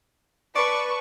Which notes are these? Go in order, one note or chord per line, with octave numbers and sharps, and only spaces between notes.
B4 D5 A5 C#6